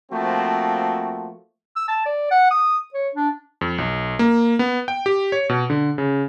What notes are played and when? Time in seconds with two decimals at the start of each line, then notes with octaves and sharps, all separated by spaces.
0.11 F3 A3 A#3 C4 F#4
1.76 E6
1.88 A5
2.05 D5
2.31 F#5
2.51 D#6
2.94 C#5
3.14 D4
3.61 F2
3.78 B1
4.19 A#3
4.59 B3
4.88 G5
5.06 G4
5.32 C#5
5.49 B2
5.70 D3
5.98 C#3